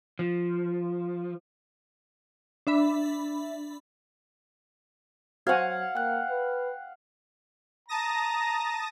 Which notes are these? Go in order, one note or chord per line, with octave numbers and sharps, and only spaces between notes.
F3
D4 E5 B5
F#3 F#4 C5 F5 F#5 G#5 G#6
A#3 G5 F#6
B4
A5 A#5 D#6 A#6